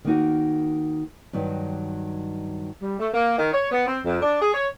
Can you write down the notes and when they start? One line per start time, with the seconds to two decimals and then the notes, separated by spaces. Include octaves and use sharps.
0.05 D#3 A#3 D#4 F#4
1.33 G2 D#3 F#3 G3
2.82 G3
2.99 A3
3.13 A#3
3.38 D#3
3.53 C#5
3.71 B3
3.87 C4
4.05 F2
4.22 D4
4.41 G#4
4.54 C#5